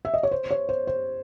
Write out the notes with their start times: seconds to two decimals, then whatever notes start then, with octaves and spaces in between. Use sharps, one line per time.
0.05 E5
0.14 D#5
0.23 C#5
0.31 C5
0.51 C#5
0.69 C5
0.87 C5